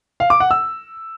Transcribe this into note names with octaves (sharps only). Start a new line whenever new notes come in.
F5
D6
F#5
E6